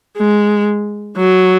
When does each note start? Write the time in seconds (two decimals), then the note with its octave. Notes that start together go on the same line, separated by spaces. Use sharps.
0.17 G#3
1.17 F#3